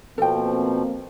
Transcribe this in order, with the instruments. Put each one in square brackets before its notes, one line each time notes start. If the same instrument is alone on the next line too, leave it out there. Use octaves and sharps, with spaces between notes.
[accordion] B2 F3 [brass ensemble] A#3 C4 [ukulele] A4 G5